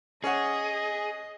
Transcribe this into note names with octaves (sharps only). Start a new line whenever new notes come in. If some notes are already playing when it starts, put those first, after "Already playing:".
C#4 G#4 C#5 D#5 F#5